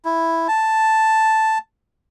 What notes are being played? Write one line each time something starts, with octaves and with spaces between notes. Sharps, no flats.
E4
A5